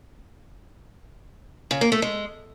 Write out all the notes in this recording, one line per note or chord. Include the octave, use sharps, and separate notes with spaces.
C#3
A#3
A3
G#3